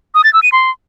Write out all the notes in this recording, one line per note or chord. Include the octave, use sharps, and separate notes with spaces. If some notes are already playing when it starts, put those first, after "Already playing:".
D#6
A6
E6
D#7
C6